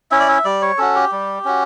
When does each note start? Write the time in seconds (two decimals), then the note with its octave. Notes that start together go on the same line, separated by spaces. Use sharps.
0.11 C#4 E4 E5
0.20 D5
0.28 E5
0.45 G3 D5
0.62 C#5
0.78 C#4 F#4 A4
0.95 G4
1.12 G3
1.45 C#4 F#4